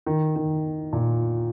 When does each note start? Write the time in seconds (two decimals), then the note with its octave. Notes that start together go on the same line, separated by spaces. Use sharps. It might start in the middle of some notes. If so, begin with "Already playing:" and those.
0.06 D#3
0.36 D#3
0.93 A#2